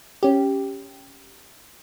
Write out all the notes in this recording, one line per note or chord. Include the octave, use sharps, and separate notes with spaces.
C#4 G4